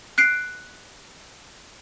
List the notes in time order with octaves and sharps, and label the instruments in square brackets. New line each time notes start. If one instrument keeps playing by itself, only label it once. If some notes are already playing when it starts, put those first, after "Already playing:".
[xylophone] F#6 C7 D7